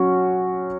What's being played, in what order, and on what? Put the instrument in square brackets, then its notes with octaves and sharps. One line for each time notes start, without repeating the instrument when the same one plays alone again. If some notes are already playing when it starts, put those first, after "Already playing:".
Already playing: [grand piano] F#3 C#4 F#4